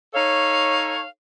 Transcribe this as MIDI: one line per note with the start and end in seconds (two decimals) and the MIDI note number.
0.14 1.02 63
0.14 1.02 69
0.14 1.02 73
0.14 1.08 77